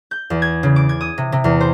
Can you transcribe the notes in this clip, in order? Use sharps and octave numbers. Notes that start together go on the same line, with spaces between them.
G6
E2
G#6
C#3
D6
G#6
D#6
C3
C3
E2
C5